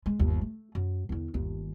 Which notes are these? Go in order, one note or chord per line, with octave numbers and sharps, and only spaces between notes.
G#3
G1 D#2
A3
F#2
E2 D3
G1 D#2